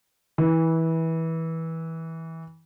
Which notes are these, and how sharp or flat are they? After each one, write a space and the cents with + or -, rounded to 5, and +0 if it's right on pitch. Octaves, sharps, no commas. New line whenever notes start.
E3 -20